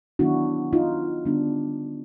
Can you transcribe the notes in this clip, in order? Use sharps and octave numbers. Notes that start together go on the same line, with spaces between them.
D#3 F#3 B3 D4 E4 F#4
D#4 F4
D3 G3 B3 D4